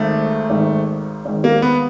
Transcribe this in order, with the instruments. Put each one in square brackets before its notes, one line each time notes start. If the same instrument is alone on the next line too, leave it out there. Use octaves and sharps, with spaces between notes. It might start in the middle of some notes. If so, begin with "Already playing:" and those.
Already playing: [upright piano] G#1 G#2 D#3 [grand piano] A3
[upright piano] G#1 G#2 D#3
G#1 G#2 D#3
[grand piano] A#3
B3